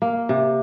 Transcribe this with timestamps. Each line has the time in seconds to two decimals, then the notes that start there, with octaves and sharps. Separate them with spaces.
0.02 A#3
0.29 C3